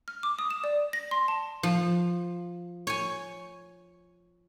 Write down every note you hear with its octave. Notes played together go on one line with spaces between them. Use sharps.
F6
D6
D#6
E7
D5
A#6
C6
A5
F3
C#5 G#5